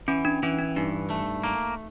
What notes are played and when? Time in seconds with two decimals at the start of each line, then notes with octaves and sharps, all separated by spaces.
0.08 E3 C#4
0.25 D4
0.43 E3 C#4
0.59 D4
0.76 G2 D#4
1.10 A3
1.44 A#3